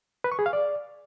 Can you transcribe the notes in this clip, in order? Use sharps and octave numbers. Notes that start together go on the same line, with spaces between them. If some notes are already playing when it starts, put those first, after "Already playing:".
B4
C#6
G#4
F5
D5